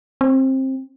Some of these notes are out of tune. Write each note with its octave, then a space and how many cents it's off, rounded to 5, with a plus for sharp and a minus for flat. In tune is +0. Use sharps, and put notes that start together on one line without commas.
C4 +20